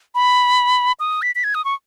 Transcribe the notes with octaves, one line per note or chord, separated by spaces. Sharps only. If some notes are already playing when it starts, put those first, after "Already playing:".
B5
D#6
B6
B6
G#6
D#6
C#6